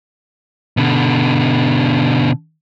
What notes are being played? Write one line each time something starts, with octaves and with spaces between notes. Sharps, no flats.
B2 D3